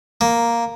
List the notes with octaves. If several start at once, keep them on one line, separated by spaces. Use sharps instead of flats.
A#3